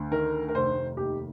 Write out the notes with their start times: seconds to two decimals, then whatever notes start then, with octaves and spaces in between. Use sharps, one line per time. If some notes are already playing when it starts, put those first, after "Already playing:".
Already playing: D2
0.11 D#3 A#4
0.48 A#4
0.54 F1 C5
0.97 D#2 G4